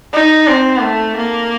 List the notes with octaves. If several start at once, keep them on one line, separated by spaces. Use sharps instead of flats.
D#4
C4
A3
A#3